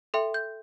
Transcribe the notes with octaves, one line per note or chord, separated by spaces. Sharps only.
A4 E5 G5 C6
G6